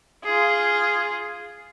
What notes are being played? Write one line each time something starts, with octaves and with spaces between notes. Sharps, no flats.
F4 G#4